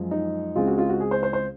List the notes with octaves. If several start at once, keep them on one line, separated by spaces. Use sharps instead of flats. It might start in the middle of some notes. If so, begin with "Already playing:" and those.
Already playing: F#2 F3 G#3
D#4
C#2 C#3 G#3 C4 F4
F#4
F4
F#4
G#4
C5
C5
C5